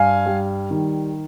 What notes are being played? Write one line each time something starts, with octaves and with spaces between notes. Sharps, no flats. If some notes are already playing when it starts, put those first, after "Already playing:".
Already playing: G2 F5 G#5
G3
D#3